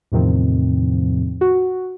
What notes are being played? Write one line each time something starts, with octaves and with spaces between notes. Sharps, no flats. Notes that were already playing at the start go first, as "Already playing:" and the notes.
E2 A2 C3 D#3 F3 C4
F#4